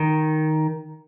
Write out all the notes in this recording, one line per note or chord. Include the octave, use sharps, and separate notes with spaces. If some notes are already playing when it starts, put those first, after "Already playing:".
Already playing: D#3